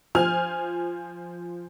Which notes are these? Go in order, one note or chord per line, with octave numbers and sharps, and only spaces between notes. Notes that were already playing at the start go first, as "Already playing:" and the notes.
F3 C5 G#5 F6